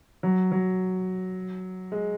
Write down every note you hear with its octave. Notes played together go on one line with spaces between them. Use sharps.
F#3
F#3
G#3